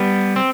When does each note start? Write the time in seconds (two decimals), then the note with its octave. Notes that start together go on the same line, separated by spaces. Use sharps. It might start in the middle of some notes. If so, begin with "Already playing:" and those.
Already playing: G3 B3
0.36 C4